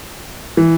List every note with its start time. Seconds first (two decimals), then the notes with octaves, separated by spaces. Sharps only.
0.57 E3